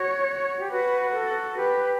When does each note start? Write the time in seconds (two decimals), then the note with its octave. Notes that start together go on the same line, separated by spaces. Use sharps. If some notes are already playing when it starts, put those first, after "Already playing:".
Already playing: F#4 C#5
0.60 G4
0.71 F#4 B4
1.14 A4
1.57 G4 B4